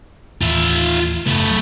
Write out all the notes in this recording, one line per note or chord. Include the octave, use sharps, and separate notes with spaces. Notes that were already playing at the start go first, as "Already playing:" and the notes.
D#2 A2 E3 F4 E5
F#2 C#3 A3 B3
C#2 F#3